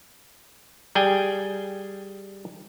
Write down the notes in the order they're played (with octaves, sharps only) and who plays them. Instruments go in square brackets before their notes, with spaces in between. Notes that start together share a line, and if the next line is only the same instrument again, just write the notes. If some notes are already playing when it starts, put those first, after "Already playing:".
[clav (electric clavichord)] G3 G#4 G5 G#5